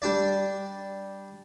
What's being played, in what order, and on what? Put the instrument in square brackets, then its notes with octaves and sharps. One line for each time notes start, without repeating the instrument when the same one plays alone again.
[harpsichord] G3 D4 D5